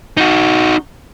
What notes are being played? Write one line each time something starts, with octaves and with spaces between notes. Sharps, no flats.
D#4 F#4